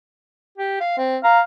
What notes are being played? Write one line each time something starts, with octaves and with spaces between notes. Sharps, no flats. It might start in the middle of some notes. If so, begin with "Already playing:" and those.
G4
F5
C4
F5 A#5